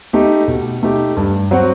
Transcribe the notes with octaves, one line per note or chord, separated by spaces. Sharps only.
A3 D#4 G4
B2
A3 D#4 G4
G2
F#3 C4 F#4